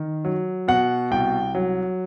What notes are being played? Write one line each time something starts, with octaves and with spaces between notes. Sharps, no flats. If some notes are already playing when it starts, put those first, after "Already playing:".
Already playing: D#3
F#3
B2 F#5
C2 G5
F#3